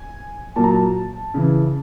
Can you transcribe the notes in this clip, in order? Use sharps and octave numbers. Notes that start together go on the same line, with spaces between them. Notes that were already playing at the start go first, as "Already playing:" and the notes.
Already playing: G#5
A#2 F#3 A5
A#5
A5
C#3 E3